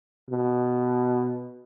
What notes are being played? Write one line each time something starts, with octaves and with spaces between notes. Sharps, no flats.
B2